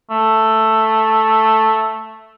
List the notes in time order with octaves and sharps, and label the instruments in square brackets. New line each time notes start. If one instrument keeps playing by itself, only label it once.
[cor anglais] A3